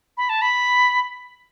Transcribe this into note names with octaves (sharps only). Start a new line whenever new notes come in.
B5
A5
B5